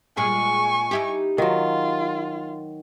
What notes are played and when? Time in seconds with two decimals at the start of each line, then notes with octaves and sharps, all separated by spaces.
0.17 A#2 G#3 G#4 G#5 C#6
0.91 D#4 E4 G4
1.38 D#3 F#3 F4